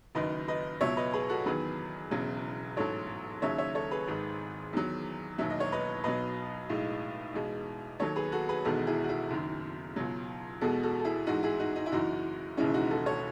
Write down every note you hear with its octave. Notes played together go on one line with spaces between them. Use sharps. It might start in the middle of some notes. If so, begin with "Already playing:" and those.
F#1 F#2 D#3 B4 D#5
B4 D#5
C#2 B2 F#3 C#5 E5
B4 D#5
G#4 B4
F#4 A4
E2 D#3 F#3 G#4 B4
E1 E2 C#3 F#3
A1 G#2 F#3 A4 C#5
D#2 C#3 F#3 C#5 E5
C#5 E5
A4 C#5
G#4 B4
G#1 G#2 D#3 G#3
E2 D#3 F#3
E1 D#2 D#3 F#3 E5
D#5
C#5
B4 D#5
B1 B2 F#3 B4 D#5
B1 A2 G#3
E2 B2 G#3
D#2 D#3 F#3 A4 C#5
G#4 B4
F#4 A4
G#4 B4
E1 E2 D#3 G#3 F#4 A4
E4 G#4
F#4
E4 G#4
F#1 F#2 D#3
C#2 B2 F#3
E2 B2 G#3 F#4 A4
F#4 A4
A4
E4 G#4
A1 G#2 E3 G#3 D#4 F#4
E4 G#4
D#4 F#4
D#4
E4
F#1 F#2 E3 D#4 F#4
E1 D#2 C#3 E3 G#3 C#4 E4
D#4 F#4
F#4 A4
A4 C#5